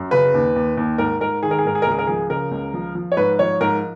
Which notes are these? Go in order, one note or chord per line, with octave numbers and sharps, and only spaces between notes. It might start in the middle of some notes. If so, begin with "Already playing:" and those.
Already playing: F#2
C#3 B4
D#2
D#2
D#2
G#2 A#4
G#2 A#4
D#3 G#4
A#4
G#4
G#2 A#4
G#4
A#4
C#2 G#4
A#4
F3 G#4
C#3 A#4
C#2
F3
F3
C#5
G#2 B4
F3 C#5
G#2 A#4